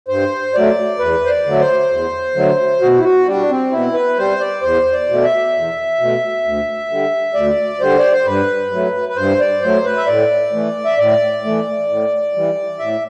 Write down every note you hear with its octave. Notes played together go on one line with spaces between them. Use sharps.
G2 C5
F#3 A3 D5
E2 B4
C5
D5
D3 F#3 A3
C5
E2
D3 F#3 A3
B2 F#4
E4
F#4
G3 D4
C4
B2 E4
B4
G3 C5
D5
E2 C5
D5
B2 A3
E5
E2
B2 A3
D2
D3 G3
D2 D5
D3 G3 C5
D5
C5
G2 B4
F#3 A3
B4
G2 C5
D5
F#3 A3 C5
B4
E5
A2 D5
E3 A3
E5
A2 D5
E3 A3
A2
E3 G3
A2 E5